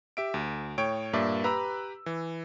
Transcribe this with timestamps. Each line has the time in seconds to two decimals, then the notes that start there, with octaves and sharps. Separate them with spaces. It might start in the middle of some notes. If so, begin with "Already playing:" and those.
0.17 G4 E5 D7
0.34 D2
0.78 A2 C#5 G5 D7
1.13 G2 A#2 A#3 D5 E5
1.44 G4 B4 A#5 B5 E6
2.06 E3